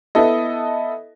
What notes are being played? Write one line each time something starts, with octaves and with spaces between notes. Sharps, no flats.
B3 E4 A4 D#5